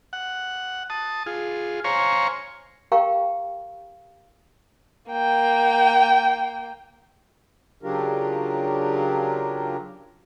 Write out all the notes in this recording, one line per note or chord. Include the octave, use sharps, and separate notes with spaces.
F#5
A5 D#6
F4 G#4
C5 C#5 F5 G#5 A#5 C#6
G4 A#4 F5 G5 A#5 C#6
A#3 G5
C#3 F#3 D4 F4 G4 A#4